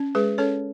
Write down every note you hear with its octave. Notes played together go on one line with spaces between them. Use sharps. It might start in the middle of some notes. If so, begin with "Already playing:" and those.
Already playing: C#4
G#3 G#4 B4
C#4 A4 C#5